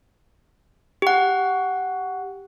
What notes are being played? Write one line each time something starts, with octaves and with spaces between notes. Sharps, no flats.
G4 F#5